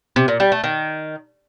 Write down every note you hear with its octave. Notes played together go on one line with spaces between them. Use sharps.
C3
A#2
G3
A3
D#3